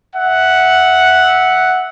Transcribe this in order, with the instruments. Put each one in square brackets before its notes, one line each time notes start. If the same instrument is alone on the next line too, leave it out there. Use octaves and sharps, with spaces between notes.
[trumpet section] E5 F#5